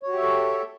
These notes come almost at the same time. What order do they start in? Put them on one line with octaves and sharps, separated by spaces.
C#5 F#4 G4 E5 A4